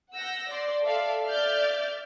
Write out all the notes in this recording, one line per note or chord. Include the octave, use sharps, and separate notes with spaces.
F#5 E6 G6 A#6
D5 C6
A4 D5 E5 F5
D5 E5 F6 G6 A6